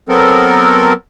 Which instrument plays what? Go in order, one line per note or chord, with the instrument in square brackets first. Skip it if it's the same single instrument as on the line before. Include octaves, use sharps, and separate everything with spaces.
[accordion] F#3 B3 C4 A4 A#4